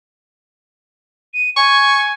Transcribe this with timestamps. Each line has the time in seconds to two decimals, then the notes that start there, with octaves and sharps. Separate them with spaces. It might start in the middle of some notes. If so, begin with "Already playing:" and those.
1.34 D#7
1.56 G#5 C#6